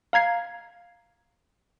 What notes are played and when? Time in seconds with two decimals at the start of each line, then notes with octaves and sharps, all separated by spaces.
0.13 F5 A#5 G#6 C7